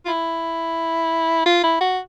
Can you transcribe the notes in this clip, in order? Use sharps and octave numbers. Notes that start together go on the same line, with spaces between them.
F4
E4
F4
E4
F#4